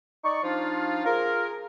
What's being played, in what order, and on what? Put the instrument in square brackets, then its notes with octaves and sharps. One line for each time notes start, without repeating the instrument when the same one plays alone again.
[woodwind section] D#4 D5 C#6
F3 D4 D#4 F4
F4 G#4 A#4